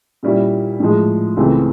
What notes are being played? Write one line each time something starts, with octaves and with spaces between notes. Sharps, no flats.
A#2 G3 A#3 C#4 E4
A2 F3 G#3
C#2 C#3 E3 A3 C4